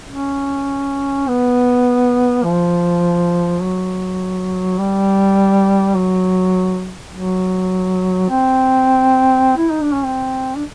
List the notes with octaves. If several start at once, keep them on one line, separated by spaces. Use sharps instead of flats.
C#4
B3
F3
F#3
G3
F#3
F#3
C4
E4
D#4
D4
C#4
C4
D4